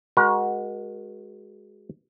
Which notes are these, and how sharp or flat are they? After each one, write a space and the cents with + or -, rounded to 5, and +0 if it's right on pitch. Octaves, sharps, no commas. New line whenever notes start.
G#3 +0 F#4 +0 A#4 +40